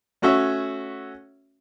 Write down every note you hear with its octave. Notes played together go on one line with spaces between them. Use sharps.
A3 C#4 F#4 C#5 E5